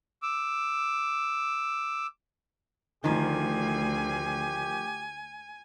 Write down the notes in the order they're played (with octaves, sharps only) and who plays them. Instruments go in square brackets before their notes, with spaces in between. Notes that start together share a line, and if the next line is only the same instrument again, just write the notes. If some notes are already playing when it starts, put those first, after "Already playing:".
[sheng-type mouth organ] D6 E6
[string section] D2 [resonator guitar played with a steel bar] D#3 F3 [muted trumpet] G4 [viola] G#5